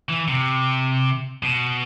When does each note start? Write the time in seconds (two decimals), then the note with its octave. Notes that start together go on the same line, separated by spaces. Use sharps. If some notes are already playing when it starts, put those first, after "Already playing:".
0.09 E3
0.28 C3
1.43 B2